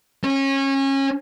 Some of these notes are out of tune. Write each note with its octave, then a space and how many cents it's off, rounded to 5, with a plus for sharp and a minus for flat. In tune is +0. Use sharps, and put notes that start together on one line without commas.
C#4 -25